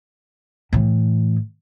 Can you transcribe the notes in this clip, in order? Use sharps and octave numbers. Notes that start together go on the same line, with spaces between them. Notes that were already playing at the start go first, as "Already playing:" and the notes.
A2 E3